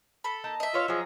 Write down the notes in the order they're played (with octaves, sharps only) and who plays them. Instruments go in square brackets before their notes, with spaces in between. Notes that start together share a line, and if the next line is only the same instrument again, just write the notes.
[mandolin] A4 B5
[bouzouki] A#3 D#4 A5
[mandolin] D#5 E5
[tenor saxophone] F4 [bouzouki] B4 C#5
[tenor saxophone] F3 [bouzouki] F#3 G#4